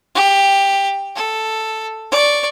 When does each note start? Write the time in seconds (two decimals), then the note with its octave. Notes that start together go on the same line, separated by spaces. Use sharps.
0.15 G4
1.16 A4
2.11 D5 C#6